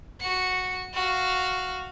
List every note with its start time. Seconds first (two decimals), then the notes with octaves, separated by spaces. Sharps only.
0.21 F#4 C#7
0.94 F#4 F5